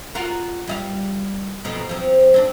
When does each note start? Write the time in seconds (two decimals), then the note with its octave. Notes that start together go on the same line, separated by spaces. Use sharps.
0.15 F4 F#4 A#4
0.67 G3 D#5 F5
1.64 F2 B2 D#4
1.89 F3 C4
2.34 C4 D4